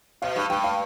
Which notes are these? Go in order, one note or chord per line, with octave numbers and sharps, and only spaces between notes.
B2 F5
G2 F5
G2 G5
F5